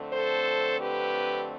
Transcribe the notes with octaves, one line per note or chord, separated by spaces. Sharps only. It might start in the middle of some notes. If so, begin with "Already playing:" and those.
Already playing: F2 D3 A3 C4
A4 C5
G4 B4